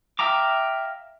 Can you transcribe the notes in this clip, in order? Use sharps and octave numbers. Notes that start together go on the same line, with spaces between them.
E5 F5 G5 A#5 D6